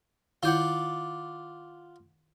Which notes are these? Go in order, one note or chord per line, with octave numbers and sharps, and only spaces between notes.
D#3 E4 F4 D5 F#5 G6